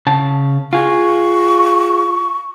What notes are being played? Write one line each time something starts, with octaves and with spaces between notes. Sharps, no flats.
C#3 A5
F4 G#4 C#6